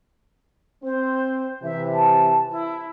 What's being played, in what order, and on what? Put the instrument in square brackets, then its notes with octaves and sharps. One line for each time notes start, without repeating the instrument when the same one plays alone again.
[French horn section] C4 [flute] C5
[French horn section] C3 E3 [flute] E5
[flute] A5
E4